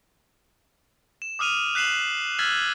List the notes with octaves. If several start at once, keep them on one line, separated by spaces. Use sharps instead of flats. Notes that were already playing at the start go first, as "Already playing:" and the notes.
E7
D6 D#6 F6 D#7 F7
F#6 B6 C7 E7 F#7
E6 F6 G#6 A6 B6 F#7